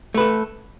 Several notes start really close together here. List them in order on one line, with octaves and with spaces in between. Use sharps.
A3 B4 A4